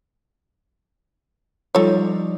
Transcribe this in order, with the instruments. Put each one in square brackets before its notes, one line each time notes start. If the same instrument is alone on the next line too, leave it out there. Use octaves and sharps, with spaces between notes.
[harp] F3 G3 D#4 [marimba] F4 [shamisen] A4 C#5